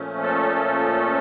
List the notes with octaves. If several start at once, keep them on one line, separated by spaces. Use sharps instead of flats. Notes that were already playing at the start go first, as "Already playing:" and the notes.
Already playing: A#2 F3 A3 C#4
A4